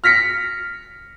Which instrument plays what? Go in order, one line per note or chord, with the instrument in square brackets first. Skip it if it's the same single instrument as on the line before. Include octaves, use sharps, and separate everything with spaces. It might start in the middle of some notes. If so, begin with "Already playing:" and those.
[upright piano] F6 A#6 B6 C#7